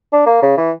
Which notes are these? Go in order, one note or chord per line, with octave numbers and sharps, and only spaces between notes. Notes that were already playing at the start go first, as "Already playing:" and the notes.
D4
A#3
C#3
E3